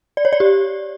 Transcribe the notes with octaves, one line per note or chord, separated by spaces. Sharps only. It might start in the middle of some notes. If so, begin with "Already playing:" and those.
D5
C#5
D5
G4